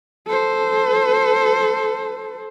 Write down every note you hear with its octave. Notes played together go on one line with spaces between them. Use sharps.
A4 C5